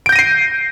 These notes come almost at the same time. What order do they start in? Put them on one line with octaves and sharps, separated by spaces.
D7 G6 A#6 D#7 C7